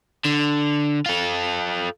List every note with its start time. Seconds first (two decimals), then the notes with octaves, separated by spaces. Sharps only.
0.25 D3
1.06 F4 A4